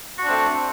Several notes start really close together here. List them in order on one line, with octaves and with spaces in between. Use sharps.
F#4 D4 C4 A3